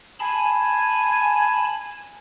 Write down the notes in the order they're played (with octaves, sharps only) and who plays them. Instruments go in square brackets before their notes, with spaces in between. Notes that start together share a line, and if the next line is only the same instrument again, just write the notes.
[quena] G#5 [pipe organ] A5 B5